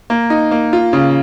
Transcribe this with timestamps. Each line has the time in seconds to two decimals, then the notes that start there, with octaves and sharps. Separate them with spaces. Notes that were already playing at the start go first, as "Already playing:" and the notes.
0.10 A#3
0.30 D#4
0.51 A#3
0.73 F4
0.93 C#3